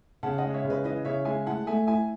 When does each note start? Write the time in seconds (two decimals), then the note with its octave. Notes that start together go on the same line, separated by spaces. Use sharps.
0.23 C#3 F#5 A5
0.38 D#5 F#5
0.44 G#3
0.54 C#5 E5
0.64 C#3
0.70 B4 D#5
0.84 E3 B4 D#5
1.05 C#3 C#5 E5
1.25 G#3 E5 G#5
1.46 A2 F#5 A5
1.67 A3 E5 G#5
1.87 A2 E5 G#5